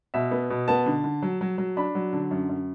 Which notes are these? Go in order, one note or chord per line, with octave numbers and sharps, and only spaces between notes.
B2 E5
B3
B2
B3 A5
D3
D3
F#3
F#3
F#3
D4 B5
F#3
D3
F#2
F#2